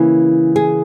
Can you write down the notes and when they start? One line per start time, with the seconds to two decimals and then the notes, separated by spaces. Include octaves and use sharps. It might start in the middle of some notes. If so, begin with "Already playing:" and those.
Already playing: C#3 E3 A#3 E4
0.56 G#4